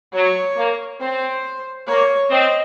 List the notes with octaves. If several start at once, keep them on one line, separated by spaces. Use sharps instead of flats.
F#3 C#5
A#3
C4 C5
A#3 C#5
C4 D#5